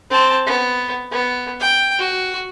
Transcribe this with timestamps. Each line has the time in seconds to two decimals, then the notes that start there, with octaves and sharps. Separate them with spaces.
0.10 C4 A5
0.46 B3
1.12 B3
1.60 G5
1.99 F#4